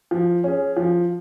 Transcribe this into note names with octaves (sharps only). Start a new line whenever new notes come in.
F3
C#4 G#4
F3